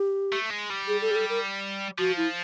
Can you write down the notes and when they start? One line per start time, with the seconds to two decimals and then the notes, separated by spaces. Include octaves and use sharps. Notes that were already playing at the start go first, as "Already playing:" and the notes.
Already playing: G4
0.33 A3
0.50 G#3
0.70 G3
0.88 G#4
1.02 A4
1.11 G#4
1.15 A4
1.29 A#4
1.98 F3 F#4
2.17 E4